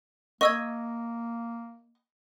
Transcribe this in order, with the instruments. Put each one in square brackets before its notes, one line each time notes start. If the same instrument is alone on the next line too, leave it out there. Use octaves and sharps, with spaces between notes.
[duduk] A#3 [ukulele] D#5 [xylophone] C#6 E6 G#6